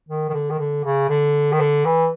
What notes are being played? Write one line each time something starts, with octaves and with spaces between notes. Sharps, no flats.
D#3
D#3
D3
D#3
D3
C#3
D3
D#3
D3
E3